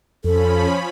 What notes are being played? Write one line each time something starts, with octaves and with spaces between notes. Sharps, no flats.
F2 F3 C#4 A4 B5